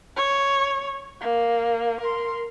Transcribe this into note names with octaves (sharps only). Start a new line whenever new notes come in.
C#5
A#3
A#4 C6